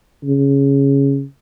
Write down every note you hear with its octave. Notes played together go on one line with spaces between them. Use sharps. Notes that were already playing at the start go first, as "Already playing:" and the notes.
C#3